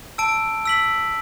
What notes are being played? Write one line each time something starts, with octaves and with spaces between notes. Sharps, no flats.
A5 E6 D7
E6 B6 F#7